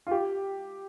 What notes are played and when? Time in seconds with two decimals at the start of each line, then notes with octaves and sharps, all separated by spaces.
0.07 F4
0.11 G4